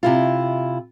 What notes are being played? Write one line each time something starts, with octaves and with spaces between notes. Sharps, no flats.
C3 E4 F4